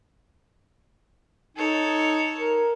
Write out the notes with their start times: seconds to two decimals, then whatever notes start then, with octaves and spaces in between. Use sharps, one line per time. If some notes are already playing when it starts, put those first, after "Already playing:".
1.57 D#4 A4 C#5
2.38 A#4